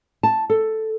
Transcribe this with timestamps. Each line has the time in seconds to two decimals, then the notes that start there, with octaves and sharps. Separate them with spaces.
0.23 A5
0.50 A4